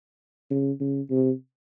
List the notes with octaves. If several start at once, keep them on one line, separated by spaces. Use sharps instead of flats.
C#3
C#3
C3